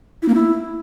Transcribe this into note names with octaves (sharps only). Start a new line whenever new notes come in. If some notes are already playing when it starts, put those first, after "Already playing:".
E4
A#3
E4